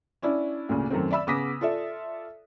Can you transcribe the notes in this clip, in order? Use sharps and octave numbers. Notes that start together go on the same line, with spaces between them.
C#4 D4 E4
D2 A#2 C#3
F#2 D#3 A3 C4
D5 E5 B5 E6
C#3 B3 D6 D#6 A#6 B6
F4 A4 D5 E5